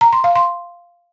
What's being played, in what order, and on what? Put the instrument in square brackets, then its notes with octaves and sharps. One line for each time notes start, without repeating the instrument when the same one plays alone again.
[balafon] A#5
C6
F5
C6